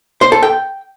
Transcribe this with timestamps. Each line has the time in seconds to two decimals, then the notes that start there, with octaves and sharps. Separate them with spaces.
0.21 C5
0.32 A4
0.43 G5